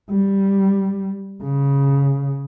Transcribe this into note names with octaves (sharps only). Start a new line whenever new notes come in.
G3
C#3